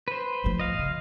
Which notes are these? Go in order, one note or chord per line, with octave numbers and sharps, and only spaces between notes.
B4 C5
A2 F3
D#5 F5
C#3